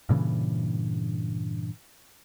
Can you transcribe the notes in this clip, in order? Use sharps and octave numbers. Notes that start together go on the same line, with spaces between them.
G2 A#2 C#3 E3